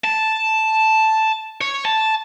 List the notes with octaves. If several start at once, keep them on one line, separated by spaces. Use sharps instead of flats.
A5
C#5
A5